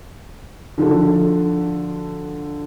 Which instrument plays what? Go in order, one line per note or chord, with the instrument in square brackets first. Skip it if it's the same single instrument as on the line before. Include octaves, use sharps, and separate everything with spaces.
[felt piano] D3 F3 F#4 A4